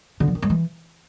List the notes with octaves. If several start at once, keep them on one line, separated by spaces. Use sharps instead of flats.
D3
F3
D#3
G#3
E3